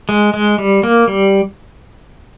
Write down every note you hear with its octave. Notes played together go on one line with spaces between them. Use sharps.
G#3
G#3
G3
A#3
G3